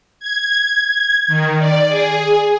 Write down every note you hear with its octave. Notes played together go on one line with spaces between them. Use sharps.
G#6
D#3
D5
G#4